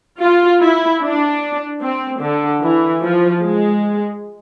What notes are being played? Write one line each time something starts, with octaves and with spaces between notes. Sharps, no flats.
F4
E4
D4
C4
D3
E3
F3
G#3